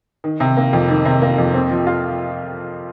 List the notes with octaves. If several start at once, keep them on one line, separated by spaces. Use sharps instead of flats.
D#3
C3
A#3
F2
D#3
C3
A#3
F2
C4
F3
F4